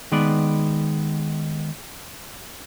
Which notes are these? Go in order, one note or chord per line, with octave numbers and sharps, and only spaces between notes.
D#3 G#3 B3 B4 D5